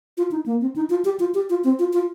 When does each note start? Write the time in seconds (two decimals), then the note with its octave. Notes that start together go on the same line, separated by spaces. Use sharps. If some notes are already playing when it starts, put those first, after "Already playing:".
0.17 F4
0.31 D#4
0.46 A#3
0.61 C4
0.76 D#4
0.90 F4
1.05 G4
1.20 F4
1.34 G4
1.50 F4
1.64 C4
1.79 F4
1.93 F4